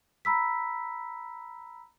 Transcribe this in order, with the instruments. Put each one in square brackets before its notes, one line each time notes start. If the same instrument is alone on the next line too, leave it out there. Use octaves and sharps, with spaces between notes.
[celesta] A#5 B5 E6 B6